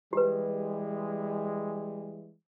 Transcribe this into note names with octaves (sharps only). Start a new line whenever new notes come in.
E3 G3 G#3 G4 B4